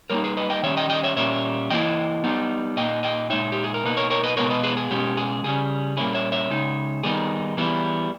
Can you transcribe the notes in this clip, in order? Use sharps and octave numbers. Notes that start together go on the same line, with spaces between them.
G3 A#3 D#4 A#4 C#5
G#4 B4
B4 D#5
D#5 G5
D#3 G3 C#4 C#5 E5
D#5 G5
D#5 G5
C#5 E5
A#2 G3 A#3 C#4 C#5 E5
E3 A#3 E4 D#5 G5
G3 B3 D#4
A#2 A#3 D#4 D#5 G5
D#5 G5
A#2 G#3 D#4 C#5 E5
G4
G#4
A#4
B2 A#3 D#4 B4
A#4 C#5
A#4 C#5
B4 D#5
B2 G#3 B3 A#4 C#5
B4 D#5
G#4 B4
G#4
B2 G#3 C#4 G4
G#4
C#3 G3 C#4 G#4
A#2 G3 A#3 C#4 E4 G#4
C#5 E5
C#5 E5
C#3 G#3 D#4
D#3 G3 B3 D#4 G#4
E3 G3 B3 E4